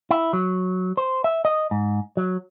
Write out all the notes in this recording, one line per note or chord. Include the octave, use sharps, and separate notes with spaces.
E4
F#3
C5
E5
D#5
G#2
F#3